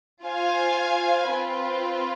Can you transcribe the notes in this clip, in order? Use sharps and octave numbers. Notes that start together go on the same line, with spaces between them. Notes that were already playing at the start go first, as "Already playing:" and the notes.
F4 C5 F5 G#5
C4 F4 B4